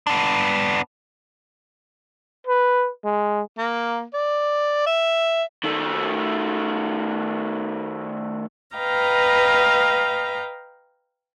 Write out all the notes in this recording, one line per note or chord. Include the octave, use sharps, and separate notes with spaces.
B3 D4
B4
G#3
A#3
D5
E5
D#3 A3
B4 D#5 F5 G5 A#5